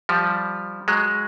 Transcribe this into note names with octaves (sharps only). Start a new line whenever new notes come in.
F3 G3
F#3 G#3